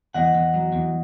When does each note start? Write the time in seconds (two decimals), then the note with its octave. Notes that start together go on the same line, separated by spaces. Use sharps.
0.14 E2 D#5 F#5
0.34 E2
0.54 F#3
0.73 E2